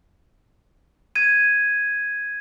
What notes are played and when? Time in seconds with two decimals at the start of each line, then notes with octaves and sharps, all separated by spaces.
1.15 G#6 D#7